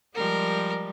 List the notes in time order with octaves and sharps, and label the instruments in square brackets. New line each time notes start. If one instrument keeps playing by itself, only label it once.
[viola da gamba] F3 G3 G#3 [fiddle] A#4